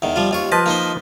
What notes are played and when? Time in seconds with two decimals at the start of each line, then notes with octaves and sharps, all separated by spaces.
0.02 E2 D#3
0.16 F3 G3 F4
0.31 D#2 F4 C#6
0.52 F3 B4 D#5 A5
0.66 A#3 D#4 C5